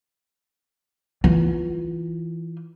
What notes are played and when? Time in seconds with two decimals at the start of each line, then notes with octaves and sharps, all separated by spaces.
1.24 E3 F4